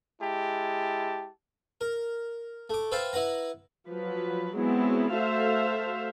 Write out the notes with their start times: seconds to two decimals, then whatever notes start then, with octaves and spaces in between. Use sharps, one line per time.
0.20 G#3 E4 G4 A5
1.81 A#4
2.70 A3 D6
2.92 B4 C5 E5 F5 G5 A5
3.13 E4 B4 F#5 A#5
3.89 F3 F#3 B4
4.55 F#3 G#3 B3 C4 E4 G#4
5.14 A3 F#4 A4 C5 E5 F5